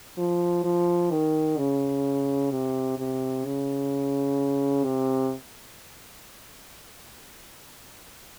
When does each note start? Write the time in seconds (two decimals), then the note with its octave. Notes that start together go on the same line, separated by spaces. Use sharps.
0.18 F3
0.64 F3
1.11 D#3
1.57 C#3
2.51 C3
2.98 C3
3.45 C#3
4.84 C3